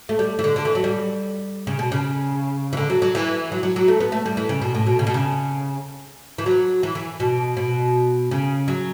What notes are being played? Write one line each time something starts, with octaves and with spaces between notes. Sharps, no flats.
A3
G3
E3
D3
D3
E3
F#3
G3
C#3
B2
C#3
E3
D3
F#3
F#3
E3
F#3
F#3
F#3
A3
B3
A3
G3
E3
C#3
B2
A2
B2
C#3
B2
C#3
E3
F#3
E3
E3
B2
B2
C#3
F#3